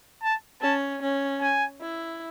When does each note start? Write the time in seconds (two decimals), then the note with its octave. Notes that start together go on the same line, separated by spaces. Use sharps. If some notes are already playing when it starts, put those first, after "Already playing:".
0.23 A5
0.62 C#4 A5
1.02 C#4
1.41 G#5
1.81 E4